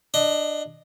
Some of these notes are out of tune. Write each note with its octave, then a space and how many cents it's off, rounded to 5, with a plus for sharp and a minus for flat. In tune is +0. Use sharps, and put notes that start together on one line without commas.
D4 +15 D#5 +0